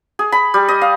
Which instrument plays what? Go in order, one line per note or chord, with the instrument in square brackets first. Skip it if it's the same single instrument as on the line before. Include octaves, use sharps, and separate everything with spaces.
[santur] G#4
B5
G3
D#5
F5